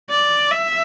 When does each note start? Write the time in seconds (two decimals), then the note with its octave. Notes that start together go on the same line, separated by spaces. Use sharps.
0.10 D5
0.51 E5